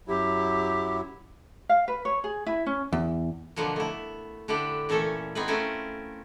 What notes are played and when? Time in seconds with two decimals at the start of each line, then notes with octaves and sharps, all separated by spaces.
0.08 F#2 F#3 E4 G4
1.69 F5
1.88 B4
2.05 C#5
2.24 G#4
2.46 E4
2.66 C#4
2.93 E2
3.56 B2 D3 F3 A#3 B3
3.76 A3 E4
4.48 D3 D4 E4 G4 B4
4.89 A#2 E3 A3 C#4 A4 E5
5.35 B3 C4 D#4 G#4 B4
5.48 A3 C4 C#4 E4 F4 A#4